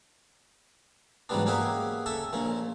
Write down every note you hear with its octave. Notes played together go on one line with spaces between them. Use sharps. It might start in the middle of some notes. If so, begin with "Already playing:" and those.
G#2 E3 F#3 G3 B3 D4
A#3 C#4 G4 G#4 E5 F#5
C#4 A4 E5 C#6
A#1 A#2 C#4